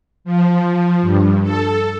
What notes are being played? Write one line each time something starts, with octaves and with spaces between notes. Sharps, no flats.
F3
G2
A4